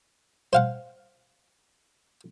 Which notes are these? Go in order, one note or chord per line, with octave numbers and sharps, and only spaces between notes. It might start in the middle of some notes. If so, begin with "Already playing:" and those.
C5 F5 F#5